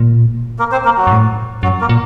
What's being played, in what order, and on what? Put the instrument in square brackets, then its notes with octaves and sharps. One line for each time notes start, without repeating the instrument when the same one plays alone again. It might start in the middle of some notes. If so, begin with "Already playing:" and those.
Already playing: [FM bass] A#2
[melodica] A#3 A#4
C4 C5
A#3 A#4
F#3 F#4
[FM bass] F#2
A2
[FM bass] F#2 [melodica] F#3 F#4
[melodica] A#3 A#4
[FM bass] A#2